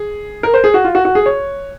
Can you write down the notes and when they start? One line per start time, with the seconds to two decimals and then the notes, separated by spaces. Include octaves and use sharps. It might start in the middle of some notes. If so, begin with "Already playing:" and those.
Already playing: G#4
0.43 A#4
0.54 C5
0.64 G#4
0.74 F#4
0.84 F4
0.95 F#4
1.05 F#4
1.15 G#4
1.26 C#5